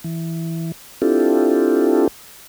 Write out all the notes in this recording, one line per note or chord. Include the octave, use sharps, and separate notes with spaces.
E3
C4 D4 E4 F4 G4 A4